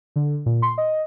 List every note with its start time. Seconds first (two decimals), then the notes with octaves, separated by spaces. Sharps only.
0.16 D3
0.46 A#2
0.62 C6
0.78 D#5